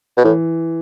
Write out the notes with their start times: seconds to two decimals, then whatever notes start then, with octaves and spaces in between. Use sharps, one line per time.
0.17 B2
0.24 A2 E3